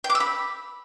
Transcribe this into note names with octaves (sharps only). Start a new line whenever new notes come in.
G5
D6
E6
B5